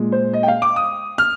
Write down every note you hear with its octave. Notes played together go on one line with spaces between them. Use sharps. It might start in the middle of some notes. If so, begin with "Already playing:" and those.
Already playing: A#2 G#3
C5
D#5
G5
F5
D6
D#6
F6